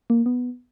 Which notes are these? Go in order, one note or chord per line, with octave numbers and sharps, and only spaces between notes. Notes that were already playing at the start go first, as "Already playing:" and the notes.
A#3
B3